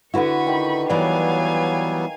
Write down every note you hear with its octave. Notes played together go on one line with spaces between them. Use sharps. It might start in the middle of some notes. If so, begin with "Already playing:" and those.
D3 E4 F#4 B4 F#5 B5 C#6
D#3 G5
E3 F#3 G3 B3 C#5 D5 F5 G#5